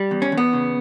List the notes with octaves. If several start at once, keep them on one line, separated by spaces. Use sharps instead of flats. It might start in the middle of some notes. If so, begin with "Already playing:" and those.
Already playing: G3
E2
C#4
E2
B3
C#3